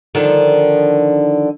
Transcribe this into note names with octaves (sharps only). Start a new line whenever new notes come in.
D3 D#3 F3